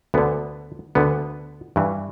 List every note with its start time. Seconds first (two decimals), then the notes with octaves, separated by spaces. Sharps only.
0.14 D2 D3 B3
0.95 D2 D3 B3
1.76 G2 E3